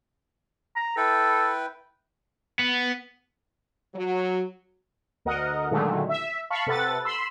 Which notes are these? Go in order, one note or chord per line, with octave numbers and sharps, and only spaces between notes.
A#5
E4 A4 B4 G5
B3
F#3
D2 A#4 D#5 F#5
A#2 D3 D#3 F#3 G#3 A3
E5
F5 A5 B5 C#6
C3 A4 B4 F#5 A6
B5 C6 E6